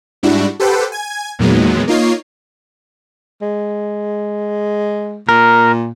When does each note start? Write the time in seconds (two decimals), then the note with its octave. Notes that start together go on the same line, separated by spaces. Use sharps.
0.23 G#2 G3 D4 E4 F#4
0.60 G4 A4 B4 C5 F#5 G5
0.92 G#5 G#6
1.39 E2 A#2 D#3 F#3 G#3 B3
1.87 A#3 D#4 F4 C#5 C7
3.42 G#3
5.29 A#2 A#4